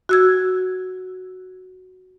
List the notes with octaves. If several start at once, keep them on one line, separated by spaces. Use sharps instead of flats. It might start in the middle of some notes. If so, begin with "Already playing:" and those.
F#4 E6 G#6